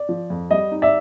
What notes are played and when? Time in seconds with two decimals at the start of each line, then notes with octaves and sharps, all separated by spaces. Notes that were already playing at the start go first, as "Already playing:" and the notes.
Already playing: D5
0.09 F3
0.30 F2
0.51 G3 D#5
0.72 D#4
0.82 D5 E5